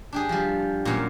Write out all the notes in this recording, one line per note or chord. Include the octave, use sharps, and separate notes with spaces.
D4 G4 G#4
F3 G3
F#2 A#2